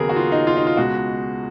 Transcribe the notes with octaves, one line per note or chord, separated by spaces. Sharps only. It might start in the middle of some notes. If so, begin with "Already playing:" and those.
Already playing: D#2 C#3 F#3 B3 G#4 A#4
F#4
F4
D#4
F4
D#4
F4
C#2 B2 G#3 F#4